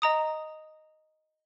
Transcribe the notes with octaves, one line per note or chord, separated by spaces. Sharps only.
D#5 A#5 D#6